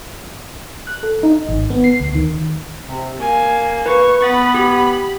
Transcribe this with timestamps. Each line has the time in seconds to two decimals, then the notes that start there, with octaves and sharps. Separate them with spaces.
0.87 F#6
1.03 A4
1.23 D#4
1.49 G#1
1.70 B3
1.84 C7
2.00 D2
2.15 D#3
2.89 C3
3.19 A#3 G#5
3.86 B4 C#6
4.22 B3 B5 A6
4.54 G4